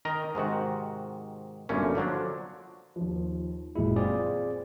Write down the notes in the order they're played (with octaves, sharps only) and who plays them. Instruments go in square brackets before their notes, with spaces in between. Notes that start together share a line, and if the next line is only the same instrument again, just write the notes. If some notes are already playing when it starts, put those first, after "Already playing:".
[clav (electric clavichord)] D#3 A#4 D#5 A#5
G#2 C3 D#3 F#4
G1 F#2 A#2 A3 A#3 C#4
D3 F3 F#3 D4
[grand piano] D#2 F3
[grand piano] F#1 A#2 G#3 [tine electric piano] E4
[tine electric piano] C4 G#4 D5 [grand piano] F4